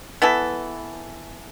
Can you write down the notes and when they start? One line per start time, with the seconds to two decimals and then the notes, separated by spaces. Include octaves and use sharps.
0.22 E3 B3 E4 A4